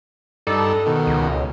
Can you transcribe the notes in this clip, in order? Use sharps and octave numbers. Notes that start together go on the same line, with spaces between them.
G2 D4 D#4 A4
B2 D#3
C#2